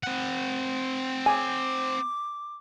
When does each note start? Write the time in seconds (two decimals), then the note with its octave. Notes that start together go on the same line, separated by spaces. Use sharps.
0.03 C4 F#5
1.26 G#5 D6